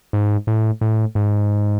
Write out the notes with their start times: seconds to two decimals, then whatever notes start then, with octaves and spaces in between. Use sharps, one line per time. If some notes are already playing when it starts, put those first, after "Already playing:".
0.13 G#2
0.47 A2
0.81 A2
1.15 G#2